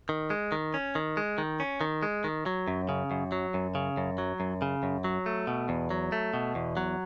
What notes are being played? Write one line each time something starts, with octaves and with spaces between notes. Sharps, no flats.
D#3
G#3
D#3
C#4
D#3
G#3
D#3
C#4
D#3
G#3
D#3
F#3
F#2
C#3
F#2
F#3
F#2
C#3
F#2
F#3
F#2
C#3
F#2
F#3
A3
B2
E2
F#3
A3
B2
E2
F#3